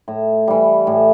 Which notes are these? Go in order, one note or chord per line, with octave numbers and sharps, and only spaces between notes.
A2
E3 G3
A2